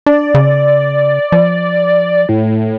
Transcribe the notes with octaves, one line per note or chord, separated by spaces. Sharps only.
D4 D5
C#3
F3
A2